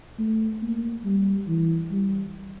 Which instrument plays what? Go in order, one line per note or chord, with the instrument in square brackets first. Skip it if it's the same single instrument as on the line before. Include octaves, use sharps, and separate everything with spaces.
[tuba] A3
A#3
G3
E3
G3